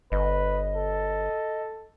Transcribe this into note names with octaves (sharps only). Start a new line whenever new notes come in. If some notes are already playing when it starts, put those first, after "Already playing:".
G1 B4 D#5
A4